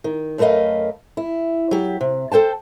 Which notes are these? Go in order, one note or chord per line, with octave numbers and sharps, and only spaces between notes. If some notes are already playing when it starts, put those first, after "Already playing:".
D#3
F#2 A3 A#4 B4 D#5 F5
E4
F#3 G4
C3
A4 C5 G5 A5